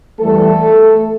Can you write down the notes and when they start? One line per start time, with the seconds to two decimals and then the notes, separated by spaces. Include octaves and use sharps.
0.20 E2 E3 G3 A3 A4